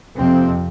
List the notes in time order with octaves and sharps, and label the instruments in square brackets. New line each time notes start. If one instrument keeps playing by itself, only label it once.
[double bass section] F2 C3 C4